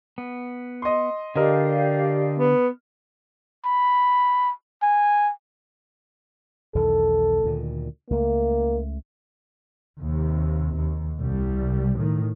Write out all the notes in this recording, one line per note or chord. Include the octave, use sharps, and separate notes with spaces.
B3
D#5 C6
D3 G4 A#4 D5 D#5 F5
B3
B5
G#5
B1 E2 D#3 A4
D2 A#2 D#3
C#2 A3 A#3
D#2 C3
D#2
C2 G3
A2 D#3